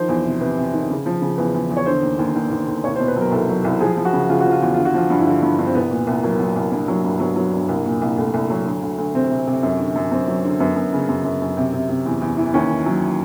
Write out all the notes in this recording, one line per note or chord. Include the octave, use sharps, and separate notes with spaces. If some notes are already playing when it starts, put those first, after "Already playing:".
Already playing: D#3 F3 C5
E2
C3
C3 B4
C3
D#3
C#3
F3
C#3
E2 B4
E2
E2
C#5
D3 C5
D#2
D#2
D#2
D#2
D#2
C2 C#5
C5
B2
B4
F#3 A#4
C2 A4
F#3
C2
F3 G#4
F3
F#4
C#3
C#3 F4
F3 F#4
F4
E2 F#4
D3 F4
F#4
F3 F4
G2
E4
D3 F4
G2
G2
C4
C2 B3
A#2
C2
F#3 A#3
F#3
C2
G2 A#3
F#3
G2
F#3 B3
F#3
G2
C2 A#3
A#2
C2
C2 A3
C2
F#3
D2
D2
D2
C3 C4
C3
C3
F#2 C#4
D3
F#2
F#2 C4
F#3
D3
F#2 B3
F#2
C#3
F#2
F#2
F#2
C3
C3
C3
E2
E2
E3
D#2 C#4
D#3
F#3